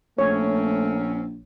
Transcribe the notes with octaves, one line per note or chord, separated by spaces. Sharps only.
A#1 A3 A#3 C4 C#4 C#5